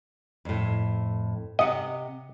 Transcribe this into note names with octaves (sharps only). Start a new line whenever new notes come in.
F2 A2
C3 D#5 F#5